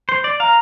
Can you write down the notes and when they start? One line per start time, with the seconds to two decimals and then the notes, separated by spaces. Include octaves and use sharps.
0.09 C5
0.24 D5
0.40 F5 A#5